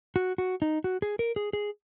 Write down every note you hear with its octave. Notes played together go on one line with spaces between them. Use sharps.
F#4
F#4
D#4
F#4
G#4
A#4
G#4
G#4